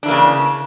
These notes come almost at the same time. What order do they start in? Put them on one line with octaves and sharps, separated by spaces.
D4 E3 A#3 C#3